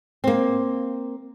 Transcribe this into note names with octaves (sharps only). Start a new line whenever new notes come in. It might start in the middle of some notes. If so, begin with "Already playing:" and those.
A#3 C4